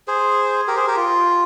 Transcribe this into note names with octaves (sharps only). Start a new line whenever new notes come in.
G#4 C5
G4 A#4
G#4 C5
G4 A#4
F4